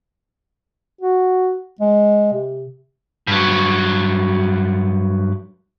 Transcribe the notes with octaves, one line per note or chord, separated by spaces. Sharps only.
F#4
G#3
C3
G2 F#3